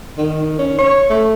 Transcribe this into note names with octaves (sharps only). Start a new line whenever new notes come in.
D#3
C#4
C#5
A3